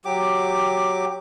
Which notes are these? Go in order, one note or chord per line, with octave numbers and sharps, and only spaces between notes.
F#3 G4 D6